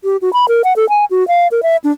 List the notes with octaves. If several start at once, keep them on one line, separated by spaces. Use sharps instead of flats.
G4
F#4
B5
A#4
F#5
A4
G#5
F#4
F5
A#4
E5
D4